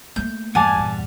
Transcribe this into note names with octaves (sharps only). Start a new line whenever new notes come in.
A3 A#3 G6
E2 G2 G3 F#5 G#5 A5 D6
D#2 A#2